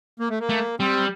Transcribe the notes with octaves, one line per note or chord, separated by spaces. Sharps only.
A#3
A3
A#3
A3
G3 C4